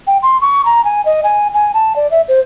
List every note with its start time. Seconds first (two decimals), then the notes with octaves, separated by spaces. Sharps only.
0.07 G5
0.23 C6
0.41 C#6
0.65 A#5
0.85 G#5
1.05 D#5
1.24 G#5
1.54 G#5
1.74 A5
1.96 D5
2.11 E5
2.28 C5